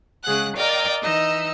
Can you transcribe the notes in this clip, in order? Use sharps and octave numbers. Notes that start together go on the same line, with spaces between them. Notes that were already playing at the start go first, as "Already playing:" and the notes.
C#3 G#3 G#4 F#5 F#6
A#4 D5 D#5 F5 G5
E3 D#4 D#5 E6